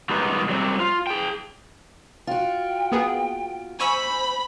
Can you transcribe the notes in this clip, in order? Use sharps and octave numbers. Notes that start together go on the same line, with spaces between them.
B2 D#3 G3 G#3 B3
F#3 G3 B3 C4
F4
G#4 G5
F4 F#4 G5
A#3 B3 G#4
C5 G#5 B5 C#6 E6